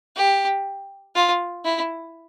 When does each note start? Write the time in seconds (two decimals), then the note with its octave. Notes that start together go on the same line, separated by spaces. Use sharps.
0.16 G4
1.15 F4
1.65 E4